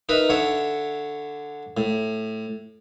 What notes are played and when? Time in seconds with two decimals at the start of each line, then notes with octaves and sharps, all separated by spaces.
0.09 D#4 A#4 B4 E5
0.29 D3 C#5 E5
1.77 A2